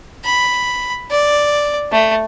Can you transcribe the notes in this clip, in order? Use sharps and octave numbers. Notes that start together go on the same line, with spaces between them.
B5
D5
A3